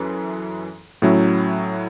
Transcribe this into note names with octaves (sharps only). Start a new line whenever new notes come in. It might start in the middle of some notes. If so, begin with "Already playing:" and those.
Already playing: F#2 E3 A4
A2 F#3 C#4 E4